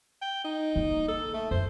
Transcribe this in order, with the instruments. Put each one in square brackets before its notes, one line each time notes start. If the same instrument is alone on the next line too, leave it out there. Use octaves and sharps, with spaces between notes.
[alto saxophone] G5
D#4
[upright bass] C#3 A#3
[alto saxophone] A4
A3
[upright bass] F#2 [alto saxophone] C5